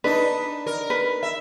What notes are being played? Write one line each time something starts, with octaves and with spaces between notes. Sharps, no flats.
D4 D#4 B4
A#4
B4
E5